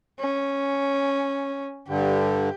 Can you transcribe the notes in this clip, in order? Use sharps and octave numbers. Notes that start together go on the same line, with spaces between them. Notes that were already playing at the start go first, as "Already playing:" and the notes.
C#4
G2 D3 G4